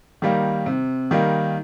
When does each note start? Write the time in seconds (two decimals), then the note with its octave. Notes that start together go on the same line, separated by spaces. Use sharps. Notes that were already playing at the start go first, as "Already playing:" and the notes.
0.22 D#3 G3 A#3
0.66 C3
1.11 D#3 G3 A#3